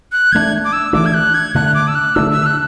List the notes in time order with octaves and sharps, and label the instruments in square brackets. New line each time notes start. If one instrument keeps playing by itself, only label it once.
[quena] F#6
[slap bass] E3 A3 D4 [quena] G#6
[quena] D6
E6
[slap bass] E3 A3 D4 [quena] D6
[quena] G#6
F#6
G#6
[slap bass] D3 A3 D4 [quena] F#6
[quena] D6
E6
F#6
[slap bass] D3 A3 D4 [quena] E6
[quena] E6
F#6